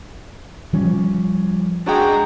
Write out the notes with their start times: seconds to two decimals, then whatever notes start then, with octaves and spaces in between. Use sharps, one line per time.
0.73 F3 G3 C#4
1.86 G#3 D4 F#4 G5 A#5